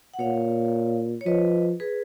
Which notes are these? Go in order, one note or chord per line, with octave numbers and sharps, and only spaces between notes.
F#5
A#2 C#5 F5
C#5
F3 B4 D#5
G#4 B4